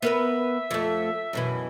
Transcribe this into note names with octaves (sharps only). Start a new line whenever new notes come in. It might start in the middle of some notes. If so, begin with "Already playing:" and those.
B3 A#4 B4 E5
F2 A3
F#2 B2 E3